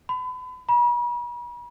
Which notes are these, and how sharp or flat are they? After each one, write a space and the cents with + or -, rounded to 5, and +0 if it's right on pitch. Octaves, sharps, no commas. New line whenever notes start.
B5 +35
B5 -45